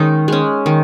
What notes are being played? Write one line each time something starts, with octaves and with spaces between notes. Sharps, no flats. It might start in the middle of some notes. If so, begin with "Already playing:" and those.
Already playing: D#3 G#3 C#4 D#4
G#3 C#4
D#3